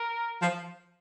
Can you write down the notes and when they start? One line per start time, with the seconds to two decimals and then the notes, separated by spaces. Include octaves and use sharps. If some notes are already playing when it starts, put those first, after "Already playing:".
Already playing: A#4
0.42 F3